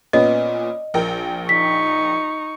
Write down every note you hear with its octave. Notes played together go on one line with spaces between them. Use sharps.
A#2 B3 C#4 D#5
A#1 A#4 G5
D#4 C#6 B6